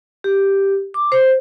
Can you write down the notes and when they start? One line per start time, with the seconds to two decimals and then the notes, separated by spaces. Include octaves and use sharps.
0.24 G4
0.94 D6
1.12 C5